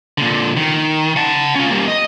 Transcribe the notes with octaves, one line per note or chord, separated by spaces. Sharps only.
A#2 D3
D#3
F#5 A5
C#4 F4
G3 A#3
D#5